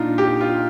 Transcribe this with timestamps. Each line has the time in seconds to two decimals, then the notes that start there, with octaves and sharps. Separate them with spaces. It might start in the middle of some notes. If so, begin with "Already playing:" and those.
Already playing: A#2 D4 D#4 F4
0.18 G4
0.41 F4